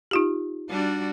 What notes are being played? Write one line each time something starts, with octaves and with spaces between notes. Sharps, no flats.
D#4 F4 G4
G3 D4 F#4